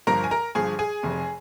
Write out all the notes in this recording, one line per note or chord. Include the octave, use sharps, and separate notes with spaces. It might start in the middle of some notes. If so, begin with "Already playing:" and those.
G1 G2 F3 A#4 A#5
G#5
A#4 A#5
G1 G2 F3 G#4 G#5
G#4 G#5
F1 F2 C3